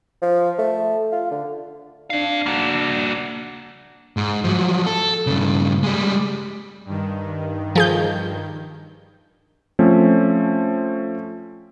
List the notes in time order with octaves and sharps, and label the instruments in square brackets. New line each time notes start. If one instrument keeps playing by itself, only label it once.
[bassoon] F3
A3
F4
D3
[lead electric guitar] C4 F5 [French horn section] D4
[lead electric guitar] A#3 F#4
G#2
F3 F#3
A4
G2 C#3
G3 G#3
[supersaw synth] G2 D#3
[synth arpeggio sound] F3 G#4 G6
[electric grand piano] F3 A3 C4 C#4